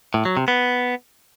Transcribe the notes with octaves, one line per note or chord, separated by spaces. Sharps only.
A2
F#3
C3
B3